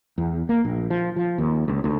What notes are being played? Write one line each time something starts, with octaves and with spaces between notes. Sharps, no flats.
E2
A#3
A#1
F3
F3
D#2
C#2
D2